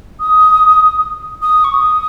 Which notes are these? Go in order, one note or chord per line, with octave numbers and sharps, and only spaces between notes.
D#6
D#6
C#6
D#6